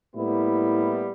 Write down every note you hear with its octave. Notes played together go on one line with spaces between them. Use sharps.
A2 G3 A#3 B3 E4